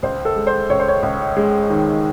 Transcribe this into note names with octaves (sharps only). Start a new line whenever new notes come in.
C#2 C5
A4
G#3
C5
C#2 C#5
C5
C#5
C#2
G#3
D#3